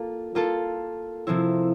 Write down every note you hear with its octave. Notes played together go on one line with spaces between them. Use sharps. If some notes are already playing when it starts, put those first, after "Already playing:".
Already playing: A#3 F4 A4
A#3 F4 A4
C3 F3 C4 E4